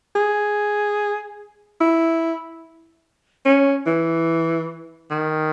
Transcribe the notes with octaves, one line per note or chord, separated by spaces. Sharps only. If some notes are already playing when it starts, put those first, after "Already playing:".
G#4
E4
C#4
E3
D#3